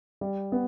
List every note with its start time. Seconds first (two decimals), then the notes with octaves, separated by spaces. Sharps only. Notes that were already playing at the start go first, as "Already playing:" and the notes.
0.21 G3
0.52 B3